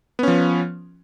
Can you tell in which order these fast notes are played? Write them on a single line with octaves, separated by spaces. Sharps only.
B3 C#4 F3